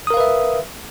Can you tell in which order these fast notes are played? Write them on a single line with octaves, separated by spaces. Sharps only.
D#6 A#4 F5 B4 E5